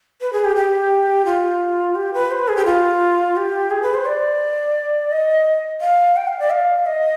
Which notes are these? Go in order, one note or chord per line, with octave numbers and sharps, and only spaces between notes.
B4
G#4
G4
G4
F4
G4
B4
C5
B4
G#4
G4
F4
G4
G#4
B4
C5
D5
D#5
F5
G5
F5
D5
F5
D#5